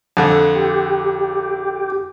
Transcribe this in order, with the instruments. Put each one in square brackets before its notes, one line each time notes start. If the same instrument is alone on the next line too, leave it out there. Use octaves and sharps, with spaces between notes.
[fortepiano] F2 D3
[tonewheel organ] G4